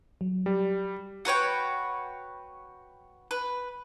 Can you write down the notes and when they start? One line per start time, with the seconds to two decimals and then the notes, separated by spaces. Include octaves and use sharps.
0.21 F#3
0.46 G3
1.25 F#4 B4 C#5 G5
3.31 B4